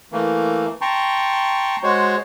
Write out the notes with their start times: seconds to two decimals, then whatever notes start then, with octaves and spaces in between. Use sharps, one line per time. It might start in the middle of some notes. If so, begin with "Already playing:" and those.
0.12 E3 A3 A#3
0.81 G5 A5 A#5 C6 C#6
1.83 G#3 F#4 C5 C#5